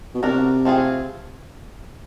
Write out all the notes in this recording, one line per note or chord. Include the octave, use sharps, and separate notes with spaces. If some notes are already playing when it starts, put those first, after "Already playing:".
B2
C3 D4 F#4 A#4
A3 C4 F4 G#4